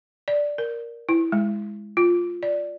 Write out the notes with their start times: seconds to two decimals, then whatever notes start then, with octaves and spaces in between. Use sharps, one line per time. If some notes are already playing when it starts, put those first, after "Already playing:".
0.28 D5
0.58 A#4
1.09 E4
1.32 G#3
1.97 F4
2.43 D5